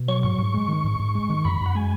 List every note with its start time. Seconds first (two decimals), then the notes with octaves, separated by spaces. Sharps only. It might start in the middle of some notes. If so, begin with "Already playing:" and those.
Already playing: B2
0.08 F#3 C#6
0.23 G#2 C#6
0.39 G#2
0.54 G#3
0.68 D#3
0.84 G#2
1.00 G#2
1.15 G#3
1.29 D#3
1.45 F#2 B5
1.61 F#2
1.66 F#5
1.75 G#3 G#5